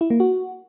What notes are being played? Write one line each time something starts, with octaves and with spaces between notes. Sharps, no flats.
E4
A#3
F#4